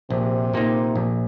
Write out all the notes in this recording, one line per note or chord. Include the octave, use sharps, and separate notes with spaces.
A#1 C3
A#2 A#3 D#4
A#1